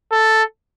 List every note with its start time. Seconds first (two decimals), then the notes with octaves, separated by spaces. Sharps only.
0.12 A4